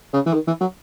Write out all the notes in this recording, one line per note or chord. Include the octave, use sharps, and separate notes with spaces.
C#3
E3
D#3
E3
F#3